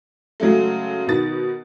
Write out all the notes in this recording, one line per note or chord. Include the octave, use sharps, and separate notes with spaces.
C#3 F#3 G#3 A3
B2 D#3 A6